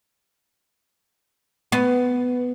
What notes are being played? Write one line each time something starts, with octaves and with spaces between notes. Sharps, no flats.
B3